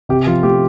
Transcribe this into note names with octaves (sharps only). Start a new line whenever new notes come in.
C3 G4
F3 F4
A3 G4